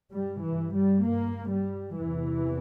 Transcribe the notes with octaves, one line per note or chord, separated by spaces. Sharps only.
G2 G3
E3
G3
A#3
G3
E2 C3 E3